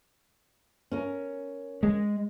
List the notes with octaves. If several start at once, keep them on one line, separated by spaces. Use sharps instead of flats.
C#4 A#4
G#3